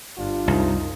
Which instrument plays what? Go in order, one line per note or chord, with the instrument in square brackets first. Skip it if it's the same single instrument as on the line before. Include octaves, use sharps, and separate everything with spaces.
[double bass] G1 [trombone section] G3 D4 F4
[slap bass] C2 [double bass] F#2 D#4